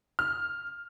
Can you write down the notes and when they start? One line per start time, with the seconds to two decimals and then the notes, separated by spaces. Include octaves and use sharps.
0.19 F6